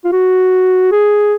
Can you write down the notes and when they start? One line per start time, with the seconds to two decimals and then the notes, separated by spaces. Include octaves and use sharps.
0.04 F4
0.12 F#4
0.92 G#4